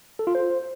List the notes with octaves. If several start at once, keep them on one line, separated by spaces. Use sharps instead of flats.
A4
F4
C5